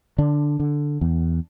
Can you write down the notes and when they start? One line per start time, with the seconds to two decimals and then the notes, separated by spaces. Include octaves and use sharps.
0.18 D3 D4
0.60 D3
1.01 E2